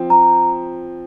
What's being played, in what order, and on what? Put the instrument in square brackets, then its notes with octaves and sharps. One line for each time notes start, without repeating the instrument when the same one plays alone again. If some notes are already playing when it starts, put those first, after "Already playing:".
Already playing: [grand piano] F3 C4
[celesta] A#5